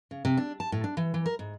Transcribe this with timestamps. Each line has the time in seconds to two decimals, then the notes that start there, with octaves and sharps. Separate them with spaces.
0.11 C#3
0.25 C3
0.37 D4
0.60 A5
0.72 A2
0.84 D4
0.97 E3
1.14 E3
1.26 A#4
1.39 G#2